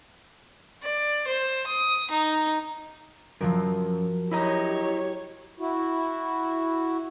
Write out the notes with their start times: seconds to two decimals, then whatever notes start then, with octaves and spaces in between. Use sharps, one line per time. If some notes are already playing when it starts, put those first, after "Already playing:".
0.83 D5
1.27 C5
1.66 D#6
2.11 D#4
3.41 F#2 F3 F#3 A#4
4.32 E4 G4 C#5 D#5 A#5
5.59 E4 F#4